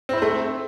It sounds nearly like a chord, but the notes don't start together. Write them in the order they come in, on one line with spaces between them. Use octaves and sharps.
C4 E4 C5 A3